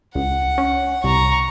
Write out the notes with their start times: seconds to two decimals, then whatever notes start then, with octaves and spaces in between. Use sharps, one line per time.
0.15 C#2 F#5
0.58 C#4
1.04 C2 A#5 C#6